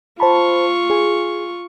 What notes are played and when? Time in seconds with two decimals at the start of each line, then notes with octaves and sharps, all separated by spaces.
0.20 F4 C5 A5 B5 C#6
0.90 G#4 G#5